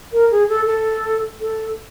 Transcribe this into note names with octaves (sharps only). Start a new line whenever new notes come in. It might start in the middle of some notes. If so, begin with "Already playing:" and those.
A#4
G#4
A4
A4
A4